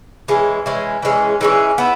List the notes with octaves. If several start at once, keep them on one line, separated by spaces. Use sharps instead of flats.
E3 G#3 C#4
E3 G#3 C#4
E3 G#3 C#4
E3 G#3 C#4
B3 E4